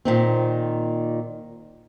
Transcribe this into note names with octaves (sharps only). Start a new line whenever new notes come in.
A#2 D#3 C4